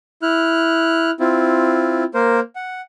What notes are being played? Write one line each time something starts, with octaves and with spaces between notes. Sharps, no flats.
E4 F6 F#6
C4 E4 F4
A#3 A#4 C5
F#5